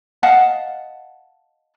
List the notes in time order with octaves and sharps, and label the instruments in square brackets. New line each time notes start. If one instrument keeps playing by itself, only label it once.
[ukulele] D#5 F5 F#5 A5